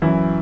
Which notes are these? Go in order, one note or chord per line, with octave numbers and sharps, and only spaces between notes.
F#2 E3 E4